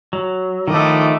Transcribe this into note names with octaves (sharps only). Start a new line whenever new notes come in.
F#3
A2 D#3 F3 A3 D#5 D6